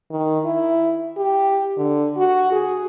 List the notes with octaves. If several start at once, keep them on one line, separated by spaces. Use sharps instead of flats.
D#3
E4
G4
D3
F#4
G#4